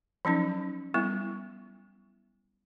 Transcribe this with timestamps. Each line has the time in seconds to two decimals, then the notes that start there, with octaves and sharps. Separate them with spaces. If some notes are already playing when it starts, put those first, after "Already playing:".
0.25 F3 F#3 C#4 D#4
0.94 G3 B3 E4